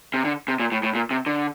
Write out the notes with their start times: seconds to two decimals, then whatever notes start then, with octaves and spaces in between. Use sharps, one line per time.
0.14 C3
0.25 D3
0.48 C3
0.60 A#2
0.72 A2
0.83 A2
0.95 A#2
1.11 C3
1.26 D3